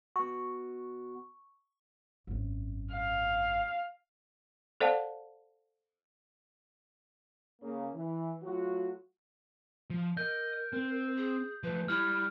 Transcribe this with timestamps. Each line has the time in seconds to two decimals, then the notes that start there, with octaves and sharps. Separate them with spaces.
0.16 B3 F#4 C#6
2.27 G#1 F#2
2.92 F5
4.81 A4 C5 D5 F5 F#5 A5
7.62 C#3 A#3
7.95 E3
8.42 F#3 A3 F4 F#4
9.90 F3
10.17 A#4 D#5 G6
10.73 C4
11.17 G#4
11.64 F3 A3 B4
11.88 G3 E4 F6